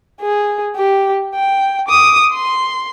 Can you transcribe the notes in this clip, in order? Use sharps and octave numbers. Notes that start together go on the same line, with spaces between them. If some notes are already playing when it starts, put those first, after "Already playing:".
G#4
G4
G5
D6 D#6
C6